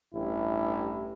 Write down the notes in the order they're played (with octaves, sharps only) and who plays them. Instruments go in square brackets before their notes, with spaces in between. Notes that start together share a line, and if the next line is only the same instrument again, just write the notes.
[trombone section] A1 G2 E4 G4